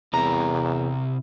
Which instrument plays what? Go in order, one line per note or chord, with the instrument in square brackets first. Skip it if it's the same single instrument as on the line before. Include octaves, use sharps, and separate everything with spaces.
[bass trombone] E2 [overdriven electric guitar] C3 E4 [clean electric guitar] A#5